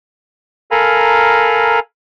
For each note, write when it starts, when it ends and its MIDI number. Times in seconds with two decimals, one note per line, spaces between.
0.71 1.80 69
0.71 1.80 70
0.71 1.80 77
0.71 1.80 80
0.71 1.80 82
0.71 1.80 83